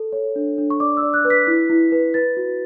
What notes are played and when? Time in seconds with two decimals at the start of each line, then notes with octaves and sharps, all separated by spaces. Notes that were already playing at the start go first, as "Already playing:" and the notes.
Already playing: A4
0.12 C#5
0.36 D4
0.58 D4
0.70 C#6
0.80 D5 D6
0.97 E6
1.03 D5
1.14 F#6
1.25 B4
1.30 B6
1.47 E4
1.70 E4
1.92 B4
2.14 B4 A6
2.37 F#4